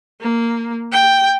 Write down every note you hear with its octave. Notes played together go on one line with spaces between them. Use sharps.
A#3
G5